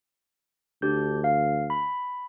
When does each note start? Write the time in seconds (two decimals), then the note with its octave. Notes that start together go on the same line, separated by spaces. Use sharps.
0.82 D2 D4 G4 G6
1.24 F5
1.70 B5